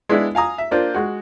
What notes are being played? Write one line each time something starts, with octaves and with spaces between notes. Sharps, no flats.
G#3 B3 D4 E4
F5 G#5 A#5 D#6
E5
A#3 D4 F4 C5
G#3 F#4